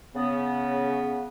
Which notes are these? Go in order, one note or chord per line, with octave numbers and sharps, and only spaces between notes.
C#3 B3